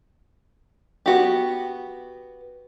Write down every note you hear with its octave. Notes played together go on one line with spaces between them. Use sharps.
B3 F#4 G4